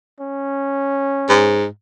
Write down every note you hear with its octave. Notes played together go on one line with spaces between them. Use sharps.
C#4
G#2